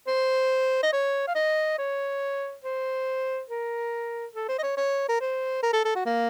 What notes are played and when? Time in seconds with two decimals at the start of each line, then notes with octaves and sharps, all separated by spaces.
0.07 C5
0.83 D#5
0.93 C#5
1.27 F5
1.35 D#5
1.78 C#5
2.64 C5
3.50 A#4
4.35 A4
4.49 C5
4.59 D#5
4.63 C#5
4.77 C#5
5.09 A#4
5.20 C5
5.63 A#4
5.73 A4
5.85 A4
5.95 F#4
6.05 A#3